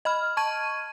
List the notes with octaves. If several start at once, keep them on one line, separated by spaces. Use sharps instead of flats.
D#5 B5 F6
A5 C#6 G#6 D#7